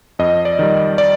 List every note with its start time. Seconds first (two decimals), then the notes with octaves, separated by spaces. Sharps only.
0.19 F2 D#5
0.45 D5
0.59 D#3 G3
0.98 D5